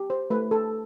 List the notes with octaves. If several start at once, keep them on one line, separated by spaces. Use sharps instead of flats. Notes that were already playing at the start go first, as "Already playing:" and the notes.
Already playing: G4
C5
A3 B4
A4